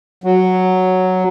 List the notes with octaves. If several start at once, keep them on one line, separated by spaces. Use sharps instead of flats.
F#3